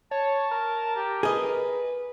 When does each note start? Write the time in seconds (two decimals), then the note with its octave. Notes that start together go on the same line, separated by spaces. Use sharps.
0.11 C#5 A5
0.51 A#4
0.96 G4
1.23 G#4 B4 D#5